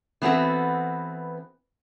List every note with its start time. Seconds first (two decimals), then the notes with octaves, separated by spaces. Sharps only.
0.22 E3 B3 C4 F#4 A4